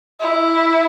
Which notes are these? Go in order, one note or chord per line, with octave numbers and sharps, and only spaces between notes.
E4